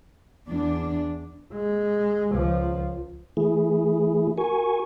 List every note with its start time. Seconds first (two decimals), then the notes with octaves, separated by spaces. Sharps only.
0.48 E2 D4
1.54 G#3
2.32 C#2 F3
3.37 E3 A3 E4 G#4
4.38 F#4 A#4 G#5 C#6